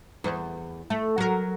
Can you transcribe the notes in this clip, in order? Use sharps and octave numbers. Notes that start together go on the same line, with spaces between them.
E2
A3
F#3 A#4